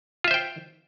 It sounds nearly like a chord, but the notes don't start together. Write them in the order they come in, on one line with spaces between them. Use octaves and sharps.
F4 E5 C5 G5